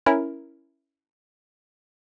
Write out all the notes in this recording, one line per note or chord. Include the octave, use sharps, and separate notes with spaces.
C#4 E4 A#4